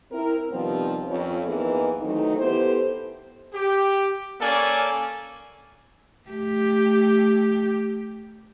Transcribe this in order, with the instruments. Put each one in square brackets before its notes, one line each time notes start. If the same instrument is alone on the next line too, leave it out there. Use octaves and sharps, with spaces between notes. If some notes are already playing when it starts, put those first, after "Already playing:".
[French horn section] C4 E4 A#4
C3 D#3 F3 G3 B3 C4
F2 C#4
F2 G#2 E3 G#3 A#3 B3
D#3 E3 F#3 A3 C4 D#4
B3 E4 G4 A4 C5
[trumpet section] G4
A#3 C#4 A4 D5 G#5
[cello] A3 G4